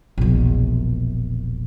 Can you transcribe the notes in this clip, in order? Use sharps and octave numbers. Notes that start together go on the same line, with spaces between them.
E1 A#1